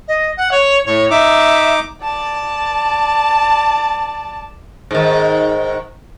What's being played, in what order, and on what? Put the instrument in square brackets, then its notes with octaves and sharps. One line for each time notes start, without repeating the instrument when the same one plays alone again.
[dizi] D#5
F#5
C#5
[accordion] A2 [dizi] C#5
[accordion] D#4 D6 [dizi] E5
[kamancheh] D5 A5
[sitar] G#2 D#3